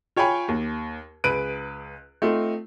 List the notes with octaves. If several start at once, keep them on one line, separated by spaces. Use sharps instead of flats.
F4 C#5 G5 G#5 B5 C#6
D#2
C#2 G#4 B4 F#6 D7 D#7
A3 C4 D#4 F4